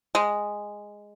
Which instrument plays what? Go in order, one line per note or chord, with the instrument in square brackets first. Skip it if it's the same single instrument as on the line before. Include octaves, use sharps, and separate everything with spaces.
[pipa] G#3